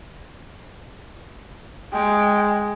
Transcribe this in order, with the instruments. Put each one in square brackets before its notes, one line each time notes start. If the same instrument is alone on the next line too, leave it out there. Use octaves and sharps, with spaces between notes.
[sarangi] G#3 [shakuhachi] G5